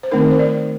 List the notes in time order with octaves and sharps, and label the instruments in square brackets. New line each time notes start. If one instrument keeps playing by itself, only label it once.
[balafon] C5
D#3 A3 C4 D#4 A#4
C5
D5